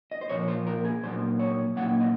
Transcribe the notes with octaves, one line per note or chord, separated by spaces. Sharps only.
D#5
C5
A#2 F3 A#3 C#5
C5
A#4
G#4
A#2 F#3 A#3 C5
C#5
A#2 F#3 A#3 F#5
D#5